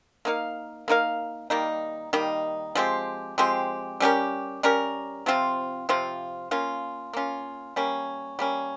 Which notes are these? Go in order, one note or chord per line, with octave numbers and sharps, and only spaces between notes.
A#3 D#4 A#4 F5
A#3 D#4 A#4 F5
D#3 G3 A#3 D#4
D#3 G3 A#3 D#4
F3 G#3 C4 G4
F3 G#3 C4 G4
G3 C#4 G4 A#4
G3 C#4 G4 A#4
C3 F3 C4 F4
C3 F3 C4 F4
A#3 C#4 F4
A#3 C#4 F4
G3 A#3 C#4
G3 A#3 C#4